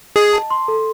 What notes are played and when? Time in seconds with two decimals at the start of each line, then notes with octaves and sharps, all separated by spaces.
0.16 G#4 D#5
0.33 A5
0.50 C6
0.68 A4